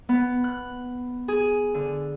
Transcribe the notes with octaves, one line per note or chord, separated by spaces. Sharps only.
B3
F#6
G#4
D3